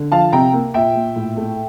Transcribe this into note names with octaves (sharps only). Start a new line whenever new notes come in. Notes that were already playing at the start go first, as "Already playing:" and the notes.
Already playing: D3
F3 F5 A5
C3 G5 A#5
A#3
A#2 E5 G5
A#2
A2
A3